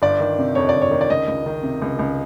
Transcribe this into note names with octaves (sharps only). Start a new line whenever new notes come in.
G1 D5
D#3
C3
F2 C#5
D5
G1
C#5
D#3
D5
C#2 D#5
C#2
D#3
C3
C#2
C#2